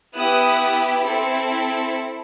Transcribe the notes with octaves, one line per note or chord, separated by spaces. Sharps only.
B3 E4 G4 D#6 F#6
C4 E4 A4